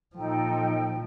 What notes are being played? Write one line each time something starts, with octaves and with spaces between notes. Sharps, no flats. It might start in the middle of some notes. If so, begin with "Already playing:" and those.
A#2 F3 D#4 A4 G5